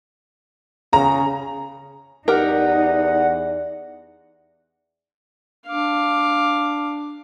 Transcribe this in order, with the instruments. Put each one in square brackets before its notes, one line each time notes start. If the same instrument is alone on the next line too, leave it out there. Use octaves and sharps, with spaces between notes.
[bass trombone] C#3 [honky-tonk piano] A#5
[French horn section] E2 D5 [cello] D#4 [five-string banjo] G4 A#4 [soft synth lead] F#5
[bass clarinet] D4 [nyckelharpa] F5 D6